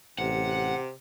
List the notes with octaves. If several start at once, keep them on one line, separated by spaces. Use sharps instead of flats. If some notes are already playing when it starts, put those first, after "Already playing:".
A1 C3 F#5